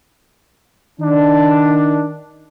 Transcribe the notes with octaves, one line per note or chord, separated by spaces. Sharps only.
D#3 D4